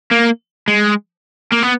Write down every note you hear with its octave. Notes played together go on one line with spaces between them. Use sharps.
A#3
G#3
A#3
B3